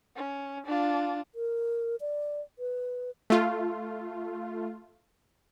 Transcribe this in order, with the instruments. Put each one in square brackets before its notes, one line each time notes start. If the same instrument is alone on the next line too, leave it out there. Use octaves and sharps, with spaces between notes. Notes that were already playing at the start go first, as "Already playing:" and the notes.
[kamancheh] C#4
D4 F4
[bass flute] A#4
D5
B4
[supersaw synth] A3 F4